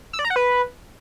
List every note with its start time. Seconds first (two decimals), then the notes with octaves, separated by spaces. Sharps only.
0.13 E6
0.19 D5
0.25 A#5
0.30 F#5
0.36 B4